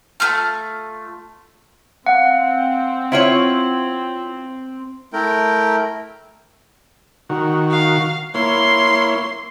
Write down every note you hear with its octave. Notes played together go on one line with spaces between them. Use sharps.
A3 F4 F6
C4 F5 F#5
E4 F4 C5 C#5 C6 F#7
A3 E4 A#4 G5
D#3 F#4
F5
A#3 E4 C#5 C6